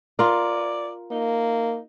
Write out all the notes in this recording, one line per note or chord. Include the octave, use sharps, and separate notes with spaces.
F4 A#4 D5
A#3 D#4